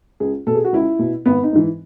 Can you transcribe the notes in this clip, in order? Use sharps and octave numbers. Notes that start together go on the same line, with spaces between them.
C#2 G#4
B2 A4
G#4
F#4
C#2 E4
B2
G#1 B3
D#4
G#2 E3